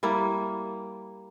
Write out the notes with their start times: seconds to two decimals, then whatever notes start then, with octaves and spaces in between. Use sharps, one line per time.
0.03 G3 A#3 E4